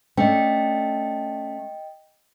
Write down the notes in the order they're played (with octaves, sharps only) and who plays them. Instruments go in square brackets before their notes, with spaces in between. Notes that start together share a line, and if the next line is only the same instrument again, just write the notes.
[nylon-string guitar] A3 C#4 D4 [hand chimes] D#5 G5